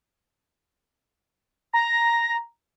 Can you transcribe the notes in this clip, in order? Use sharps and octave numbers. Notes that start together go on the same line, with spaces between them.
A#5 A#6